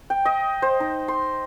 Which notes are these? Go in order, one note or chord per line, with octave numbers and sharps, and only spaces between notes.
G5
D#5
C5
D#4
C6